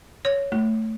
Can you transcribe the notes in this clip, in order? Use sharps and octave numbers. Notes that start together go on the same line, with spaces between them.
C#5
A3